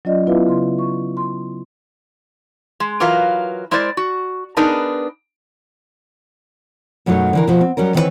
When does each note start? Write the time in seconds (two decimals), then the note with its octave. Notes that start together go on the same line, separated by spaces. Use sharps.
0.05 F#3 C#4 F4 D5 D#5
0.27 B3 E4 F4 B4 E5 F5
0.47 C#3 C6
0.79 C#6
1.17 C6
2.80 G#3
3.00 E3 F#3 F4 A#4 B4 F5
3.71 G#3 E4 A#4 C5 D5
3.97 F#4
4.57 B3 D4 D#4 G#4 A#4 B4
7.06 F#2 B2 F#3 A3 D#4
7.33 D3 E3 A#4
7.47 B2 F3
7.61 C4
7.77 F#3 G3 C#4 A#4
7.94 D#3 E3 C4 E4 B4 C#5